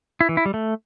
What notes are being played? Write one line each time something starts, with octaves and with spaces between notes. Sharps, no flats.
E4
E3
E4
G3
A3